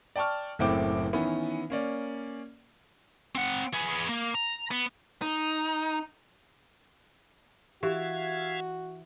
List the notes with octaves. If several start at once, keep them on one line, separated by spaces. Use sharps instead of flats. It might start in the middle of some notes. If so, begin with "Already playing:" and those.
D5 G5 A5 C#6 F6
F#1 A2 A3 C4 G5 D6
D#3 E3 B3 C#4
A#3 C#4 D5
C4 F#5
B3 G#4
A#3
A#5
B3
D#4
E3 F#4 G4 E5 F5 G#6